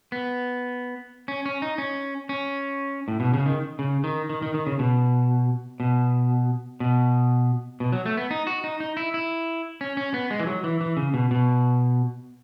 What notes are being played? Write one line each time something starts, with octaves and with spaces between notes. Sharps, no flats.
B3
C#4
C#4
D#4
C#4
C#4
A2
B2
C#3
D#3
C#3
D#3
D#3
D#3
D#3
C#3
B2
B2
B2
B2
F#3
A3
B3
D#4
F#4
D#4
D#4
E4
E4
C#4
C#4
B3
G#3
E3
F#3
E3
E3
C#3
B2
B2